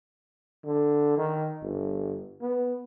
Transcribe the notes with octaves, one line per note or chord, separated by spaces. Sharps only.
D3
D#3
G1
B3